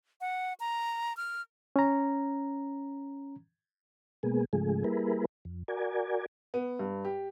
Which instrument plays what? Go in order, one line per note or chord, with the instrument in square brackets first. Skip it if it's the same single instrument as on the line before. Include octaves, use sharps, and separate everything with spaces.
[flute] F#5
A#5
F6
[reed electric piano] C#4 A#5
[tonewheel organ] B2 G#3 A#3 B3 G#4
G#2 C#3 F3 G#3 A3 G#4
G3 A#3 E4 G#4 A#4 B4
F2
F#4 A#4 D5 G#5
[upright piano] B3
G2
G4